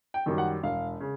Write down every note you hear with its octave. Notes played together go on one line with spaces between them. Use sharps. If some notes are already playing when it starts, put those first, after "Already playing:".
G5
F#2 D#3 G3
F#5
E1 F5
C#3